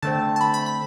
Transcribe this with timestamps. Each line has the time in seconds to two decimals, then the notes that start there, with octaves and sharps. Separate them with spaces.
0.02 D3 A3 C4 A5
0.36 A5
0.41 B5
0.54 B5
0.66 B5